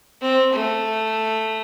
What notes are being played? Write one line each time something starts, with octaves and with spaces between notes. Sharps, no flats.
C4
A3